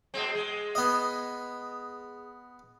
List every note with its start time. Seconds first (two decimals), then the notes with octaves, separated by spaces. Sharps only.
0.14 B2 G#3 C4
0.35 G#3
0.75 B3 D#5